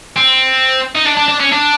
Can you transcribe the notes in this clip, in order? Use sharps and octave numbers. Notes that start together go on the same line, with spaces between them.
C4
D#4
D4
D4
D4
C#4
D4